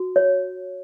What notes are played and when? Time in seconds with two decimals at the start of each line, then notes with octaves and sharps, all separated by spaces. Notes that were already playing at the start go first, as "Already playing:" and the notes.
Already playing: F#4
0.16 C#5